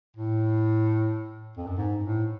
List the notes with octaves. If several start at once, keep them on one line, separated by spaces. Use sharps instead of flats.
A2
F2
F#2
G#2
A2